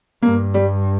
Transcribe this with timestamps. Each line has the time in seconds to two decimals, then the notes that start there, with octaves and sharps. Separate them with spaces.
0.22 G2 A#3
0.54 G3